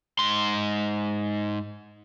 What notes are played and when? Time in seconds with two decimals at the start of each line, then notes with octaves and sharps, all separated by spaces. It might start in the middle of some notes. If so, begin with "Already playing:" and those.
0.19 G#2 C6